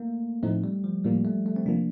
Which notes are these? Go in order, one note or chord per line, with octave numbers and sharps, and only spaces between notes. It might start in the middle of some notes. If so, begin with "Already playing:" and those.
Already playing: A3 A#3
A2 F3 A3 C4 D#4
G3
F3
A2 F3 G3 A#3
A3
A3
C4
C3 F3 A#3 D4